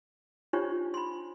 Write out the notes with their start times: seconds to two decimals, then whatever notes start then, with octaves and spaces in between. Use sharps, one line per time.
0.53 D4 D#4 F4 G4 C5 C#5
0.94 B5 C6